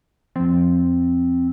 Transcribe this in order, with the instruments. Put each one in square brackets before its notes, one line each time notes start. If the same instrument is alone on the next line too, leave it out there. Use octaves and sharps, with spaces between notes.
[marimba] F2 F3 [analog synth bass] C4